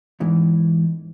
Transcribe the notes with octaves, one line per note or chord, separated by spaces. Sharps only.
E2 G#2 E3